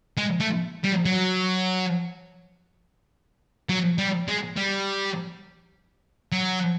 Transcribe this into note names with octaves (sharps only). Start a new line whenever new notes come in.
G#3
A3
G3
F#3
F#3
G3
G#3
G3
F#3